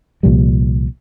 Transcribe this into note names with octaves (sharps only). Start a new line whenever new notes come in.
C2 A#2 F3 G3